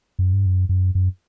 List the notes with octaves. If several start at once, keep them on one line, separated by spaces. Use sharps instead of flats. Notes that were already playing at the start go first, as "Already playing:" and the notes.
F#2
G2
F#2
F#2
F#2